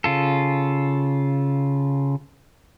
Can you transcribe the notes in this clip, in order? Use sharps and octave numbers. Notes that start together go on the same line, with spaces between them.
C#3 F4 A4